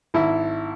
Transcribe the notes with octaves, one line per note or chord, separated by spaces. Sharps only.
G#1 E4